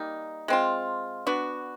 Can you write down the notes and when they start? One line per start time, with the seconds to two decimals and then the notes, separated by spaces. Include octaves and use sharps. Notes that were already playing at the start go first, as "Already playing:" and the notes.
Already playing: G3 A#3 D#4
0.48 G#3 C4 F4
1.27 B3 D4 F#4